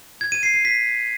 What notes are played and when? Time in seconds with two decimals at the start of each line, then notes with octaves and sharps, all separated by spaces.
0.21 G#6
0.32 D#7
0.43 C7
0.54 C7
0.65 B6